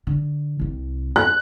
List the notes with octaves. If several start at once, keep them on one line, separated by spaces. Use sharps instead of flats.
D3
C2 C3
F#6